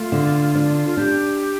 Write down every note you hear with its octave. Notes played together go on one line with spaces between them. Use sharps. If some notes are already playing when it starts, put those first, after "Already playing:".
Already playing: A3 F4
D3
D4
F4
D4 G4